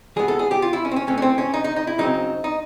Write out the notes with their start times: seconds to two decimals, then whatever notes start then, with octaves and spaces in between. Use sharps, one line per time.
0.16 E3 G#3 B3 G#4
0.28 A4
0.39 G#4
0.51 G4
0.62 F4
0.73 E4
0.85 C#4
0.91 C4
0.96 C#4
1.07 E3 A3 C4 C#4
1.18 C#4
1.22 C4
1.38 C#4
1.54 D#4
1.64 D#4
1.76 D#4
1.87 E4
1.98 C#3 F#3 A3 C4 D#4
2.44 D#4